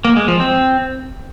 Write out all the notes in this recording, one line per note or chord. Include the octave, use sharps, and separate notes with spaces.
A#3
G#3
F3
C4